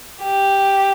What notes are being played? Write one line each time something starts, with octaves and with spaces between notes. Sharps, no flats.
G4